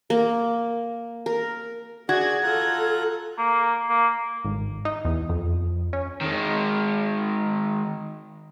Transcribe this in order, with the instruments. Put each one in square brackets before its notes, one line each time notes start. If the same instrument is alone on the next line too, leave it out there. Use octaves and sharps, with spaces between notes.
[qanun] A#3
A#4
[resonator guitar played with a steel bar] F#4 [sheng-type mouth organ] G#4 D5 F#5 [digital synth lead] G#6
[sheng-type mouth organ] F4 A#5 F#6 [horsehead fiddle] A4
[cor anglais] A#3
A#3
[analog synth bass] G#1
D#4
E2
F2
C#4
[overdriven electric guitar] D#3 G#3